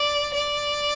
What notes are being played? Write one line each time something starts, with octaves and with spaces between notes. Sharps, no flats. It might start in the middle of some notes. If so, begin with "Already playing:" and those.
Already playing: D5
D5